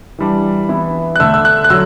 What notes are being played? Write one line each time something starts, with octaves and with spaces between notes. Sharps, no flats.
E3 G3 D4
E3 B3 E4
F#6
D3 A3 D4 E6
E6
F#6
F#6
D3 F#3 E6